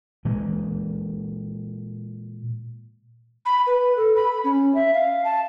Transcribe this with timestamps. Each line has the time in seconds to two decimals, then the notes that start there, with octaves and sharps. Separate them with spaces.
0.25 A#2 E3 G#3
3.46 B5
3.67 B4
3.97 A4
4.16 B5
4.44 C#4
4.75 E5
4.94 F5
5.25 A5